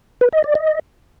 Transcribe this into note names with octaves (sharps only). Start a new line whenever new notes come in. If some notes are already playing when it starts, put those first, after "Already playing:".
B4
D#5
D5
D#5